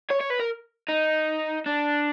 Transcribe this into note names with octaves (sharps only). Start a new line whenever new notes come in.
C#5
C#5
B4
A#4
D#4
D4